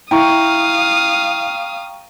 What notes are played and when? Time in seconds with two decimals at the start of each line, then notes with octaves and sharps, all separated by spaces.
0.11 E4 F5 G5 A#5 C#6 D#6